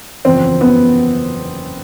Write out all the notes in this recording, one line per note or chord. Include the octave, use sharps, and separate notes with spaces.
F#1 E2 C#3 F3 C4
F#1 E2 C#3 F3 B3